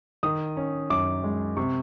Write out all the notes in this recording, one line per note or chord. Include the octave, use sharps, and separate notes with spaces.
D#3 D#6
C#4
F#2 D6
G#3
C3 C#6